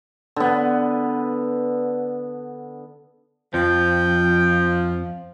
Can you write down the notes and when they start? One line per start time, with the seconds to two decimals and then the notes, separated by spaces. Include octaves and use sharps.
0.36 D3 B3
3.54 F2 F3 G5